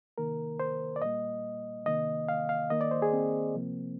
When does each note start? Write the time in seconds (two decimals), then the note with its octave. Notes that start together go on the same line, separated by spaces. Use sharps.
0.18 C3 D#3 A#3 A#4
0.60 C5
0.96 D5
1.01 A#2 G3 A#3 D#5
1.86 C3 D#3 A#3 D#5
2.29 F5
2.49 F5
2.70 D#3 A#3 D#5
2.81 D5
2.91 C5
3.02 G#4
3.13 C4
3.55 C3 F3 A#3